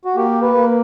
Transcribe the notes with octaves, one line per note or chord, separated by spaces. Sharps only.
F#4
A#3 G4
B4
A#3